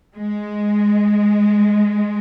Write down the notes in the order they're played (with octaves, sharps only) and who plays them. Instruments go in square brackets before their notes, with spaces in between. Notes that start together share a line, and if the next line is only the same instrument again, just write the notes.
[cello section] G#3